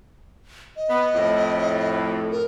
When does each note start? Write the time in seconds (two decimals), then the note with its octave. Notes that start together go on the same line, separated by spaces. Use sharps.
0.77 D#5
0.90 B3
1.14 F2 A2
2.32 A#4